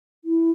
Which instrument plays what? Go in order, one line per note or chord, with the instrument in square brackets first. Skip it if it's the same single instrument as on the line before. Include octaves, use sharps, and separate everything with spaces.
[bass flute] E4